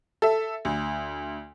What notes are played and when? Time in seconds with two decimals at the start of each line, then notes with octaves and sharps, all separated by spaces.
0.22 A4 E5
0.65 D2